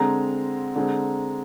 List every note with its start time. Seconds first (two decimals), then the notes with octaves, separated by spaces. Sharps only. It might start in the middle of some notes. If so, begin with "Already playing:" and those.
Already playing: D3 G#3 C4 A#5
0.75 D3 G#3 C4